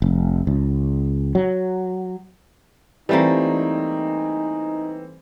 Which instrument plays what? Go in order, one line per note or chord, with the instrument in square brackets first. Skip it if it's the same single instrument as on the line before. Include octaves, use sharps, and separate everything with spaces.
[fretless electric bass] F1
C#2
F#3
[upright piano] E3 C4 [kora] G3 A3 A#3 [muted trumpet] D#4